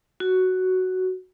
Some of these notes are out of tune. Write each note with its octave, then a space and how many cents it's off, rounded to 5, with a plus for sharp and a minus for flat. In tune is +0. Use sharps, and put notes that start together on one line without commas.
F#4 +5